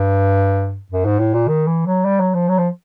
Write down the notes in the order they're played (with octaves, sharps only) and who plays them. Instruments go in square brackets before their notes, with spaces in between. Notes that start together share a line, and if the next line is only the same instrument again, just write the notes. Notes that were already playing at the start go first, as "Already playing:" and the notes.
Already playing: [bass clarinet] G2
F#2
G#2
A2
A#2
D#3
E3
F#3
G3
F#3
F3
F#3
F3